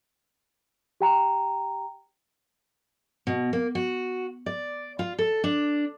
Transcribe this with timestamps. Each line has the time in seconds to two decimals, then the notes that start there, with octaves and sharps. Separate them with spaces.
1.01 G4 G5 A#5
3.27 B2
3.53 A#3
3.75 F#4
4.46 D5
4.99 F4
5.18 A4
5.44 D4